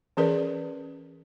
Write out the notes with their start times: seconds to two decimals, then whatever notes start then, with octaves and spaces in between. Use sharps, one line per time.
0.17 E3 C#4 G#4 A#4 B4 D5